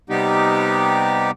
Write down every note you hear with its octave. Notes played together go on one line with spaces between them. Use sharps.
C3 G3 B3 D#4 G4